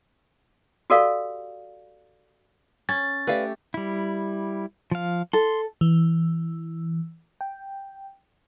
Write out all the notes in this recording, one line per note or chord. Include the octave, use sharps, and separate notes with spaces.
F#4 G4 A4 A#4 D5 F5
C#4 A6
A3 G4 B4 D5 F5
G3 E4
F3 F5
A4 C6
E3
G5